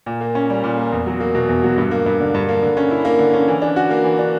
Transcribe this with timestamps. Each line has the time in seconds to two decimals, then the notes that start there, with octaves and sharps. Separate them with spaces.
0.06 A#2
0.21 A#3
0.35 C#4
0.50 G3
0.64 A#2
0.77 A#3
0.92 E2
1.06 F#3
1.20 A#3
1.35 B2
1.49 E2
1.63 F#3
1.78 G2
1.91 A#3
2.06 G2
2.20 D3
2.34 G2
2.49 A#3
2.63 D3
2.77 C#4
2.91 E4
3.05 A#3
3.19 D3
3.34 C#4
3.48 E3
3.62 D4
3.76 F#4
3.90 A#3
4.04 E3
4.19 D4